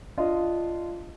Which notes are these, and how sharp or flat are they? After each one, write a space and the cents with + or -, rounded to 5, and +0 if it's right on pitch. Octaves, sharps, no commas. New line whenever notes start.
D4 +0 F4 -15 D#5 +0